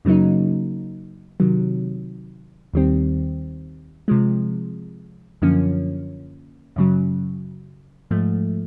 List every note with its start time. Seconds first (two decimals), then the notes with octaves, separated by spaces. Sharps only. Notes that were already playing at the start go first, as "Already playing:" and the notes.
0.05 F#2 C#3 F#3 A#3 D#4
1.40 C3 D#3 F#3
2.73 D#2 D#3 G3 C4
4.08 C3 F3 G#3
5.42 F#2 D3 F3 A#3 C#4
6.76 F#2 C#3 F#3
8.11 G#2 F3 A3